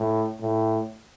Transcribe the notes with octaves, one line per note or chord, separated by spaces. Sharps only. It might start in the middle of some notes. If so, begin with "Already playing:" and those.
Already playing: A2
A2